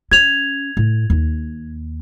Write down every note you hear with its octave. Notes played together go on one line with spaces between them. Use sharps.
C#4 G#6 F7
A2
D#2